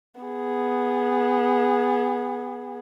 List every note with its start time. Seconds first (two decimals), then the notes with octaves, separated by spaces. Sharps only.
0.21 B3 G#4